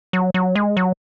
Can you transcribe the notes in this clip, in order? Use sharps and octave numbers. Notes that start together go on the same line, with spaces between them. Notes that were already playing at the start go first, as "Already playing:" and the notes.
F#3
F#3
G#3
F#3